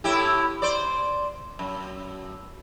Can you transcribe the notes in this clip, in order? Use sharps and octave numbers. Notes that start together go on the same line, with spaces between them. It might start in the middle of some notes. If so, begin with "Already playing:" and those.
A2 E4 G4
C5 D5
F#2